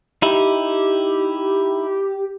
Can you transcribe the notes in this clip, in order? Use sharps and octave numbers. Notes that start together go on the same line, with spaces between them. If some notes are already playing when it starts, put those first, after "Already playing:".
D#4 E4 G4